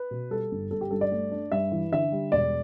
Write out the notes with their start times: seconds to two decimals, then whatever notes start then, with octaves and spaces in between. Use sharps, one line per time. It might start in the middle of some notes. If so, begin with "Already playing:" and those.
Already playing: B4
0.11 B2
0.30 G3 A4
0.51 G1
0.71 G1 A4
0.81 G4
0.91 G2 A4
1.01 D5
1.12 A3
1.31 D4
1.52 G2 E5
1.72 E3
1.92 D3 E5
2.12 G3
2.32 E1 D5